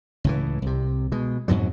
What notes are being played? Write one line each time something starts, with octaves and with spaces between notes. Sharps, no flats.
C#2 A2 E3
C2 C3
B2 G#3
F2 G#2 B2 F#3